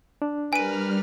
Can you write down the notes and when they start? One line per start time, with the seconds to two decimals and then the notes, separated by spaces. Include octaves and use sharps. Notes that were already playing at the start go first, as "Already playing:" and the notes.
0.22 D4
0.53 G3 A#4 B4 G#5 F6 D#7